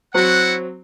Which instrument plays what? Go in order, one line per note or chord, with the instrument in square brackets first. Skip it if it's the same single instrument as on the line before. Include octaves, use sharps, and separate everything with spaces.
[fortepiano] F#3 C4 [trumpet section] E4 F#4 F#5